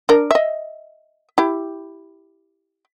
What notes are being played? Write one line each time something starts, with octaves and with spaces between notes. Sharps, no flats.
D4 A#4
D#5 E5
E4 G4